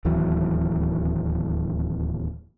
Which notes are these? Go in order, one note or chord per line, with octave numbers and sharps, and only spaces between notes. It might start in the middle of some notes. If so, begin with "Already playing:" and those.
D1 D#2 E3 F#3